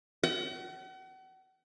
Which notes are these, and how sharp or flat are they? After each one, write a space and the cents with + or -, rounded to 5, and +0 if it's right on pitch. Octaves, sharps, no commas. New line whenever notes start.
F#5 +40